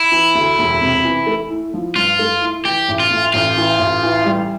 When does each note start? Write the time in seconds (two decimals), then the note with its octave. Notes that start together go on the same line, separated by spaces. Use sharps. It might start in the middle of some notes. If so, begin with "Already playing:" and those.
Already playing: E4
0.12 E3
0.35 D2
0.59 E1
0.81 C3
1.04 E3
1.27 A3
1.50 E4
1.74 F3
1.96 G2 F4
2.19 A3
2.41 E4
2.64 E3 G4
2.88 A1
3.00 F4
3.10 A2
3.34 A1 F4
3.57 E3
3.79 A1
4.03 E3
4.25 G3